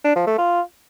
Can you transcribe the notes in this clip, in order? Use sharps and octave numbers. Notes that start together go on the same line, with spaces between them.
D4
F3
A3
F4